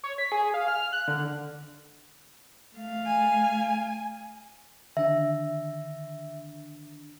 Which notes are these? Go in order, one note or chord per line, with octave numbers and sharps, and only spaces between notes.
C#5
B6
G#4
F5
F6
F#6
D3
A3 F5
G#5
D3 D#3 D4 E5